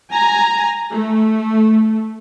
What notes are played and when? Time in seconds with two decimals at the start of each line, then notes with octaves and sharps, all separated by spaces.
0.12 G#5 A#5
0.93 A3